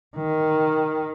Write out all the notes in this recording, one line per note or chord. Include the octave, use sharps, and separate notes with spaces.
D#3